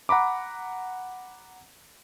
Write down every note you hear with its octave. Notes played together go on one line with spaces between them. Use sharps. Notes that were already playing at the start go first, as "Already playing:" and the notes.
F#5 A#5 B5 D6